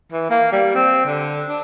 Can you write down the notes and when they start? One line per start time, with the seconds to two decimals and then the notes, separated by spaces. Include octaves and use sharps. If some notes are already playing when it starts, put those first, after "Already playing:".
0.12 E3
0.30 A#3
0.52 G3
0.75 C4
1.05 D3
1.47 D4